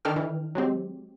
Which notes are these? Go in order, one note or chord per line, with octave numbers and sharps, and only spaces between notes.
D#3 D4 A4 G5 F6
E3
F#3 G#3 C4 G4